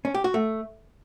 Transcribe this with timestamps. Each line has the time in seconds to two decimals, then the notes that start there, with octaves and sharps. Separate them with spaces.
0.05 C#4
0.15 G4
0.24 F#4
0.34 A3